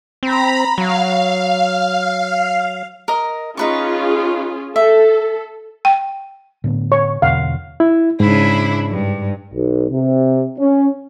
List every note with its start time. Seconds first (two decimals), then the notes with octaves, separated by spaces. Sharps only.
0.23 C4 A#5 B5
0.78 F#3 F5
3.08 A#4 D#5
3.57 C#4 D#4 F4 G#4 B4 C#6
4.76 A4 E5
5.85 G5
6.64 A2 D3 B3
6.92 C#5 C#6
7.22 E2 B2 D3 F5 F#5
7.80 E4
8.20 G#2 C#3 D4 E4
8.89 G2
9.54 B1
9.90 C3
10.59 C#4